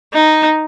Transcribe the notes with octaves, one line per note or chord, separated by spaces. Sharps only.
D#4